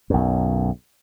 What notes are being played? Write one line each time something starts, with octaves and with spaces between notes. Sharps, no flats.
B1 F#2